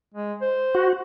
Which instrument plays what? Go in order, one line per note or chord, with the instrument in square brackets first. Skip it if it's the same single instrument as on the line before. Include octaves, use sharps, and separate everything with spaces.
[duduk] G#3
C5
[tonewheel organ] F#4